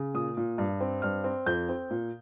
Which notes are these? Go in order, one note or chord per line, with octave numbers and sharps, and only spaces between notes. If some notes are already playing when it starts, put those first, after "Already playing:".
Already playing: C#3
A#2 D#6
A#2
G2
C4
G2 F6
C4
F2 G6
C4
A#2